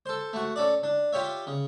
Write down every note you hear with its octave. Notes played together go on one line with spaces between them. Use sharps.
A4 C5
A3 F#4
C#4 A4 D5
D4
F4 G4 C#5 E5
C#3